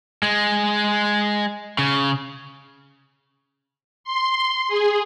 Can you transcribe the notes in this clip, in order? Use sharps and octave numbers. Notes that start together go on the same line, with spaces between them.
G#3
C#3
C6
G#4